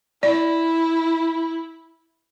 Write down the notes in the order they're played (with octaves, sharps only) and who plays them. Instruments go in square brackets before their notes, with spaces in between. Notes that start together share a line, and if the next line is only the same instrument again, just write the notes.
[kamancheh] E4 [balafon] D5